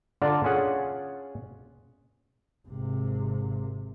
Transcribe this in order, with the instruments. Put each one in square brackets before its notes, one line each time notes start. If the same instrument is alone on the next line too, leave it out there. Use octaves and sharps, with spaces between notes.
[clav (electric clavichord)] D3 F4 D5 F5 A5 A#5
C#4 F4 G#4 F#5
[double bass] G#1 C3